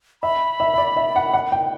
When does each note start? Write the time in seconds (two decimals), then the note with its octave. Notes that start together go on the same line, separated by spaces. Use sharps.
0.22 E5 B5
0.60 E5
0.74 E5
0.78 D5
0.96 E5
1.16 F#5
1.33 F#5
1.52 G5